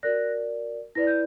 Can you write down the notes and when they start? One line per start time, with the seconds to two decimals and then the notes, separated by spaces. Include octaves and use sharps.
0.03 F#4 A#4 D5 F#6 A#6
0.95 E4 B4 D5 A#6
1.07 G6